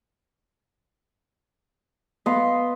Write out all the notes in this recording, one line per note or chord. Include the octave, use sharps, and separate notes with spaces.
B3 D#5 F5 C6